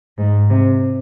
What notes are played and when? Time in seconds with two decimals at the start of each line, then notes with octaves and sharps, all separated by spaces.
0.18 G#2
0.50 C3